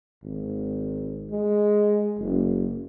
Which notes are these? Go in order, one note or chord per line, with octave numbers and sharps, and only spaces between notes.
G#1
G#3
F#1